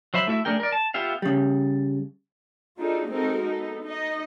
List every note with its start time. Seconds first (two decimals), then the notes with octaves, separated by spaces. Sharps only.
0.14 F#3 C5 E5 B5
0.27 A3 E4 F#4 E5
0.45 A3 D4 G#4 A#4 G5
0.60 A#4 D5
0.72 A5
0.94 B3 F4 G4 E5 F5
1.22 C#3 G3
2.78 D4 D#4 F4 F#4 G#4 A4
3.09 G#3 C4 D#4 F#4 A4 A#4
3.41 B3 D#4 A4
3.84 D#4 D#5